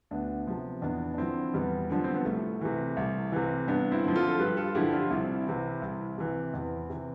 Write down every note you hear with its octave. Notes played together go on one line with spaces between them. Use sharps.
D2 B3 D4
C3 F3
E2 B3 D4
D4
D3 F3 C4 E4
E2 G3 B3
D3 F3 D4
C4
B3
C2 A3
C3 E3
C2
C3 E3
G2 B3 D4
C4 E4
D3 F3
F4 A4
A4
G2 G4 B4
F4 A4
D3 F3 E4 G4
D4 F4
C2 C4 E4
C3 E3
C2
C3 E3
E2
C3 E3